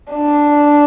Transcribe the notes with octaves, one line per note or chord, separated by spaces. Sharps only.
D4